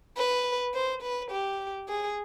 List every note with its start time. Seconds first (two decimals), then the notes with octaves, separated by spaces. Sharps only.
0.17 B4
0.74 C5
1.02 B4
1.31 G4
1.89 G#4